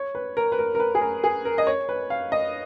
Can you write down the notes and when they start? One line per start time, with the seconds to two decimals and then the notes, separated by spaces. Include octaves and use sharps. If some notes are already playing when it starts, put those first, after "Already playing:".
Already playing: C#5
0.15 B4
0.37 A#4
0.52 B4
0.59 A#4
0.75 A#4
0.80 B4
0.95 G#4
1.01 A#4
1.24 G#4
1.45 A#4
1.58 D#5
1.67 C#5
1.89 B4
2.10 F5
2.32 D#5